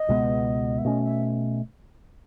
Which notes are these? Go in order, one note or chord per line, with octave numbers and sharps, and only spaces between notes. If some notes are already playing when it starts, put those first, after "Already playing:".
Already playing: D#5
C#2 B2 G#3 B3
E5
B2 A3 C#4 D#5
E5